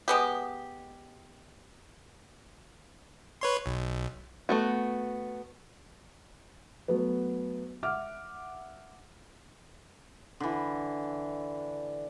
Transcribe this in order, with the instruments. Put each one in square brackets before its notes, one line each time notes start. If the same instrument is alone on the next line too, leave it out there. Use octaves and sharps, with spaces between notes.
[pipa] G#3 B3 G4
[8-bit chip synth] B4 C#5 C6
B1
[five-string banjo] A3 B3 F#4
[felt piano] F#3 A3 B3
E5 F#5 D6 F6
[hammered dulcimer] D3 E3